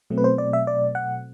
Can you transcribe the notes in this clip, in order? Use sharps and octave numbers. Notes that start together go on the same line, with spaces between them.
B2 F#3 A3 C4
B4
C5
D5
E5
D5
F#5